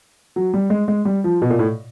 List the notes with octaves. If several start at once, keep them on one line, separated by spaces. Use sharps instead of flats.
F#3
G3
G#3
G#3
G3
F3
B2
A#2
A2